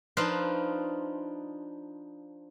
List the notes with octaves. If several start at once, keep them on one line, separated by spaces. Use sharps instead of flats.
F3 D4 D#4 F4 B4 C6